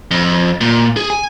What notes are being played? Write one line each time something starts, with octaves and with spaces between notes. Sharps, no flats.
F2
A#2
G#4
G#5